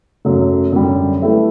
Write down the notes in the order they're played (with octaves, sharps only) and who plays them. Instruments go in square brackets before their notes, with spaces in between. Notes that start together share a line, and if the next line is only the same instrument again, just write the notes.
[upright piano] F#2 F#3 A3
F#2 D3 G3
A3 E4 G4 B4 E5